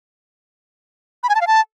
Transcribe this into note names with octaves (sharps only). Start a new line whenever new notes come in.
B5
G#5
A5
F5
A5